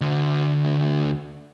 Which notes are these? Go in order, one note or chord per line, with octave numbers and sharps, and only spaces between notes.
D2 D3